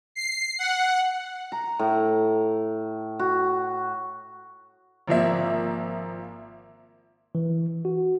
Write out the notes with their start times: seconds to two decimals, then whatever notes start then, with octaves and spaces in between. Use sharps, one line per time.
0.15 C7
0.59 F#5
1.52 A#5
1.79 A2
3.19 F#4
5.08 G#1 F3 A#3 E5
7.35 E3
7.85 F#4